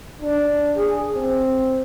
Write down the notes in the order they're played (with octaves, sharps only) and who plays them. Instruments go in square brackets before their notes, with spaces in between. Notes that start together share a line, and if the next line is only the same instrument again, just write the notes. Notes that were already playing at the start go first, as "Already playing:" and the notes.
[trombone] D4
G#4
C4